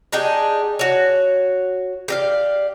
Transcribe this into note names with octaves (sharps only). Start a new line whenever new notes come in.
D4 D#4 G4 G#4
F#4 C#5
G4 D5 F5